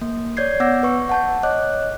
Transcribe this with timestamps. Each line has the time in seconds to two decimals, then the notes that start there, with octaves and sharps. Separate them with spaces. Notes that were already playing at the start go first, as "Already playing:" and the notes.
0.01 A#3
0.37 C#5 D5 G6 G#6 C7
0.60 B3 F#5 D6 E6 G6 A#6
0.83 B4 C#6
1.09 F#5 A5 G6
1.43 C#5 D#5 D6 F#6